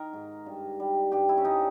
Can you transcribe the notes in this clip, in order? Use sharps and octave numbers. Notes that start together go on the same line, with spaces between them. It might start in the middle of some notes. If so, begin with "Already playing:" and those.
Already playing: D#3 A#4
G#2
G2
G3
G2 G4
E4
C#4
G2 D#4